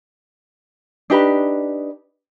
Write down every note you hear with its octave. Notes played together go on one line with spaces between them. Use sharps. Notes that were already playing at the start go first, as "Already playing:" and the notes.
D4 D#4 G4 B4